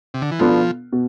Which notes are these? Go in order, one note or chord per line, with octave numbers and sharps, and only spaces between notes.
C3
D3
E3
B2 F3 B3 D4 F4 A4
B2